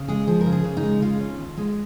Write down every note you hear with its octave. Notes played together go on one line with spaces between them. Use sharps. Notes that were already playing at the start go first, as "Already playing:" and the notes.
Already playing: C#3
G#3 G#4
F3 G#4
A#4
C#3
G#4
C#3
D#4
G#3
C#3 F4
C#4
D#2
G#3